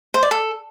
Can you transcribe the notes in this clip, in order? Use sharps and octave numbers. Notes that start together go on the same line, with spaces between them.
C5
D5
A4